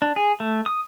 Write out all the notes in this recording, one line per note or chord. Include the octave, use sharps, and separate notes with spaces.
D4
G#4
A3
D#6